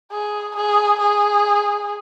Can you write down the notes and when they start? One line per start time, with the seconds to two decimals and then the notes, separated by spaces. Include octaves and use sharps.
0.12 G#4
0.56 G#4
0.99 G#4